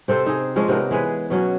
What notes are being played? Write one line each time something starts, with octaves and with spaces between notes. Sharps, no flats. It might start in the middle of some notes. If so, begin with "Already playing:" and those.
C3 C4 A4 C5
D#4 G#4
F3 G#3 C#4 D4
C3 B3 D#4 A#4
E3 G#3 G#4 B4
B2 F#3 C#4 F#4